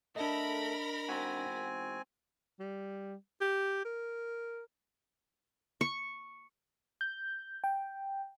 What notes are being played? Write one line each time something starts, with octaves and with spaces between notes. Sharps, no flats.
A3 D4 A4 A#4 D#5 B5 A#6
E2 G#2 C4 F#4 G#5
G3
G4
A#4
C#6
G6
G5